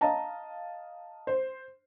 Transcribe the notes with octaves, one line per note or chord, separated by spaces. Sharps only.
D#5 F5 A5 A#5
C5